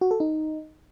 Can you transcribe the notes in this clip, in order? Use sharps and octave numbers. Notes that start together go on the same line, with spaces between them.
F#4
A4
D#4